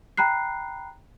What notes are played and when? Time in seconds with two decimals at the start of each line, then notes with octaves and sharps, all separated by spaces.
0.17 G5 A#5 B5 F#6 C7